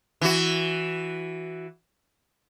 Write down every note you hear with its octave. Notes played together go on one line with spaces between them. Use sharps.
E3 F#4